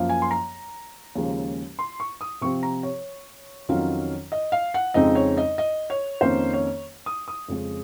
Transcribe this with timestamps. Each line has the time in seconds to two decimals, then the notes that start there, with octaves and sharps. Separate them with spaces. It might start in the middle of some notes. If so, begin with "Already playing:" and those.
Already playing: F#2 F3 A#3 F4
0.09 G#5
0.22 C6
0.31 A#5
1.15 D#2 C#3 F3 G#3 C#4
1.79 C6
2.00 C#6
2.21 D#6
2.41 C3 F3 C4 C#6
2.63 A#5
2.83 C#5
3.69 F2 D#3 F#3 C#4 F4
4.32 D#5
4.52 F5
4.74 F#5
4.94 F2 C#3 G#3 C4 D#4 D#5
5.15 C#5
5.37 D#5
5.58 D#5
5.90 C#5
6.21 F2 D#3 A#3 C#4 C5
6.53 C#5
7.06 D#6
7.28 D#6
7.48 F2 C#3 G#3 C#4